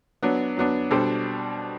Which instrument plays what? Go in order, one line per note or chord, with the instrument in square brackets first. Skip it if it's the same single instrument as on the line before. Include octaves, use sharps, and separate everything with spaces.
[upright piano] F#3 B3 D4
F#3 B3 D4
B2 G3 D4 A4 C5